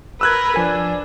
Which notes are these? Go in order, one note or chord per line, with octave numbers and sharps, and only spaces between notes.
A#4 B4 E6 F#6 G#6
F3 D4 G#5